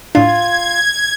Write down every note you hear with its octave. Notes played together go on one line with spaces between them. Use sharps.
A2 D4 F4 G#6